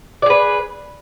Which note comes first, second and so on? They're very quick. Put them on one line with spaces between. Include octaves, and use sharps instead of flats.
D5 G#4 B4